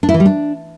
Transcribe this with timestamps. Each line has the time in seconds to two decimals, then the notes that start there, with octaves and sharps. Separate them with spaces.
0.03 D4
0.09 E4
0.14 E3
0.20 G3
0.26 D4